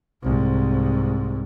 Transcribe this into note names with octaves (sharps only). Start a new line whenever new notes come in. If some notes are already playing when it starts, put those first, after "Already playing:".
C2 G#2